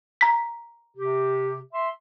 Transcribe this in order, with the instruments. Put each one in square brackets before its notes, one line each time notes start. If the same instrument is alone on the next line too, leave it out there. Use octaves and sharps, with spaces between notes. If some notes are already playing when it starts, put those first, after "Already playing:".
[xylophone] A#5 B6
[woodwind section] C3 G4
E5 C6